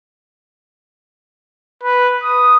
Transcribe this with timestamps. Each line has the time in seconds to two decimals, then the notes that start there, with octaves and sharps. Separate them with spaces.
1.83 B4
2.24 D#6